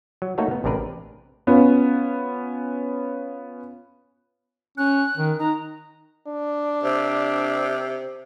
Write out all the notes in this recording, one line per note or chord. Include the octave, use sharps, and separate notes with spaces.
F#3
A3 A#3 D#4 F#4 A4 C#5
B3
A1 C3 D4 A#4 B4
B3 C#4 F4
C#4 F#6
D#3
D#4 A#5
D4
C3